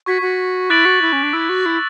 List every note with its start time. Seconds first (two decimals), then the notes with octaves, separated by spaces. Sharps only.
0.06 F#4 C#6 G#6 B6
0.22 F#4
0.70 E4 D6 F#6 A6 D7 F#7
0.85 F#4
1.02 E4
1.13 C#4
1.23 D4
1.33 E4 E6 G#6 D7
1.49 F#4
1.66 E4